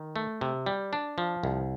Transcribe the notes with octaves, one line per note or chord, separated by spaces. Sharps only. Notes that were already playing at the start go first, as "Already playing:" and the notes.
Already playing: D#3
A3
C3
G3
D4
F3
C2